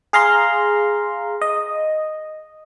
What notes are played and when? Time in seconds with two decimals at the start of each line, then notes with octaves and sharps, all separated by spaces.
0.13 G#4 F5 A#5 C6
1.41 D#5